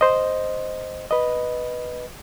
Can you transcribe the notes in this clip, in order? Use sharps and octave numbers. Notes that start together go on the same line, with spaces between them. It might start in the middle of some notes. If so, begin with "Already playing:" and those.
C5 D#5
B4 D#5